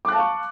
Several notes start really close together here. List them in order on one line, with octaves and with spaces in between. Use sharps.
D6 F#6 A5 F5 C#6